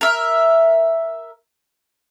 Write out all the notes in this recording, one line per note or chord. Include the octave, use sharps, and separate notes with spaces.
A#4 E5